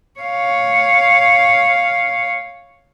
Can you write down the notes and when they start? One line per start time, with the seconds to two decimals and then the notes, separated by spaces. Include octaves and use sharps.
0.20 C#5 F5